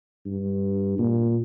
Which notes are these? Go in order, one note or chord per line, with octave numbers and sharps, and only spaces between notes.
G2
A#2